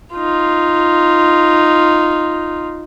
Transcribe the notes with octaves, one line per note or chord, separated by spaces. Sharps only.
D#4 F4